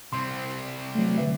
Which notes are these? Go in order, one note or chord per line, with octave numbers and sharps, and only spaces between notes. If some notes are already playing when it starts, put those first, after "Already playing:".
C2 C4 C6
F#3 A3
D3 B4 E5